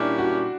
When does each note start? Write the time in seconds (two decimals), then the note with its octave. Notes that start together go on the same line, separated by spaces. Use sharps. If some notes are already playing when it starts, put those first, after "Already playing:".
Already playing: A#2 G3 C#4 D4 E4 G4
0.18 F#4